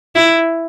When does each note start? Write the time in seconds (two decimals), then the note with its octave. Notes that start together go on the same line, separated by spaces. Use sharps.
0.15 E4